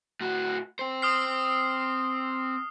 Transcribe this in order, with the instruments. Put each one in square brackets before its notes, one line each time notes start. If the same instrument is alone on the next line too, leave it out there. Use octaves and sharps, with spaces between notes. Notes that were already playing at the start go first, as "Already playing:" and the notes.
[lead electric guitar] A2 F#4
C4 C5
[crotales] D#6 F6 C7